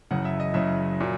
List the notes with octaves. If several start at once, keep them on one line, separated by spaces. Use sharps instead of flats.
F#1 F#2 C#3 E3 F#5
E5
D#5
F#1 F#2 C#3 E3 E5
A#2 F#3